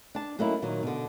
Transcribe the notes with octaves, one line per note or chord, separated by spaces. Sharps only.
D4 A5
F#3 A3 A#3 C#4 D#4 E4
A#2 D#3 F#3
B2 D3